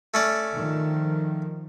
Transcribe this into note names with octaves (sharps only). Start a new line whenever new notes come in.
A3 C#4 D5
D#3 F3